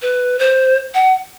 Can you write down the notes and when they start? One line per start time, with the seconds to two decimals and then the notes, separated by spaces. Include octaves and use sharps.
0.02 B4
0.39 C5
0.94 F#5